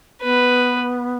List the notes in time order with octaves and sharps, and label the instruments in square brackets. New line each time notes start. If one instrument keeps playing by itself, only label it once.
[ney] B3 [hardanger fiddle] B4